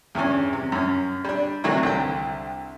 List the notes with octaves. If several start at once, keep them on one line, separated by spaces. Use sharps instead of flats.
E2 G2 E3 C#4
C3
F#2 C#4
G3 D4
C3 D#3 E3 F#3 A3 A#3
C2 D3 G5